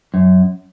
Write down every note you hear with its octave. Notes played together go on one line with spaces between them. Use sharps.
F#2